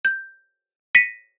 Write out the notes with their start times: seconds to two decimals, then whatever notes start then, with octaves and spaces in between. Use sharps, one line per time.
0.05 G6
0.95 A#6 B6 C#7 D#7